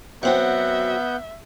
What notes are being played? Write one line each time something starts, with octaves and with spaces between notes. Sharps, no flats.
F#3 B3 C4 F#4 E5 F#5 G6